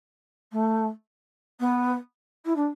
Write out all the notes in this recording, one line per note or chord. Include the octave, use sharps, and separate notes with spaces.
A3
B3
E4
D4